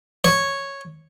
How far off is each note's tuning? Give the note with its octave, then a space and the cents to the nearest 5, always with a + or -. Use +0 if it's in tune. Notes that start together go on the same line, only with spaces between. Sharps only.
C#5 -5